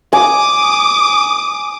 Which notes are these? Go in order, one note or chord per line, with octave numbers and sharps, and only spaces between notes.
G#5 D6 D#6